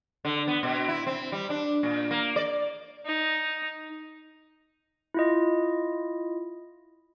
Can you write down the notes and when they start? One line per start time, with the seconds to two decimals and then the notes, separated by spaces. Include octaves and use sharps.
0.25 D3
0.47 B3
0.63 B2
0.88 E4
1.07 C4
1.32 G3
1.50 D4
1.83 A#2
2.11 A#3
2.36 D5
3.06 D#4
5.14 E4 F4 D#5